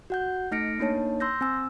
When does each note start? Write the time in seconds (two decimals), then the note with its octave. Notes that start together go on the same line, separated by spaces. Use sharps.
0.10 F#4 F#5 G6
0.51 A3 D#4 F6 A#6 C#7 D7
0.79 A#3 D4 D#4 C#5 A5
1.20 C6 E6 G6 A#6
1.41 C4 G#5 E6